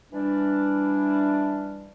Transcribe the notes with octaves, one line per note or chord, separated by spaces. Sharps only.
E3 G3 D4